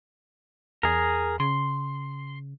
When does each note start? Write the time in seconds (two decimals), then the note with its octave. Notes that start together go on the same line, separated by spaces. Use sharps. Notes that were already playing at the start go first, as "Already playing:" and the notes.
0.83 E2 G#4 A#4
1.40 C#3 C6